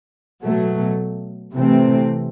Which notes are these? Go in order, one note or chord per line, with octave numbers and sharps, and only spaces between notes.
B2 F#3 A3
C3 E3 A3 C4